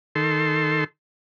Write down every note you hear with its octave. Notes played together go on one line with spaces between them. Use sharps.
D#3 A4 C6